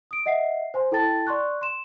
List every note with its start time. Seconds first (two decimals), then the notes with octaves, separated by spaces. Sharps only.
0.11 D#6 D7
0.26 D#5 E5 F#5 C7
0.74 C5 G#5 C6
0.92 E4 A4 G5 A5 A6
1.27 D5 C6 C#6 F#6
1.61 C6 E7